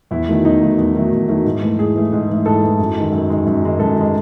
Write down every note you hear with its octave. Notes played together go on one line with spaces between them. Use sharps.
E2 E4
D#3 F#3 A3
E2 D#4
D#3 F#3 A3
E2
D#3 F#3 A3
E2
D#3 F#3 A3
G#2
E3 A3
G#2 G#4
E3 A3
G#2
E3 A3
G#2 A4
E3 A3
F#2
D#3 G#3
F#2
D#3 G#3
F#2
D#3 G#3
F#2 A4
D#3 G#3